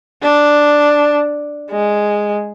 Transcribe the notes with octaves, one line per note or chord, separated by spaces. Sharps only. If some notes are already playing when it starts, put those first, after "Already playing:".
D4
G#3